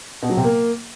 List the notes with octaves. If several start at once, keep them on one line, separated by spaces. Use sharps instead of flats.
B2
F#3
C3
A#3